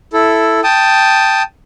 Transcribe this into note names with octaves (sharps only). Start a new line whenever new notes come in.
E4 A4
G5 A5 D#6